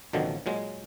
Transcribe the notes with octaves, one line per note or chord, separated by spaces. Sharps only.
A1 B2 D3 D#3 F3 F#3
A#2 F#3 G#3